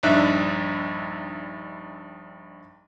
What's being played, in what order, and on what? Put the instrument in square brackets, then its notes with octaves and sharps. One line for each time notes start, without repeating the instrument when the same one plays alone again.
[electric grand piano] A#1 G2 D4 D#4 E5 F#6